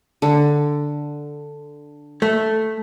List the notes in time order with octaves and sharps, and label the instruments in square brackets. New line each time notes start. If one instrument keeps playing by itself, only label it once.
[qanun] D3
[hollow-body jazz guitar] A3